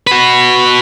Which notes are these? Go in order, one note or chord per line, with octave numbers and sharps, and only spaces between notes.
F#4 B4